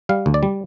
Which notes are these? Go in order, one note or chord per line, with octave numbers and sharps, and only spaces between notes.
G3 F5
D2
D5
G3